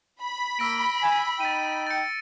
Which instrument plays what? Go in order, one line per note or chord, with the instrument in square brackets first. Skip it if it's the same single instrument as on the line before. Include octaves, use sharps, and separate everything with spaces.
[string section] B5
[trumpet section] A#3 [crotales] E6 A#6 D7
[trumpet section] G#5
[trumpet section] D#4 G5 [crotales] A6 D#7
[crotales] A6 C#7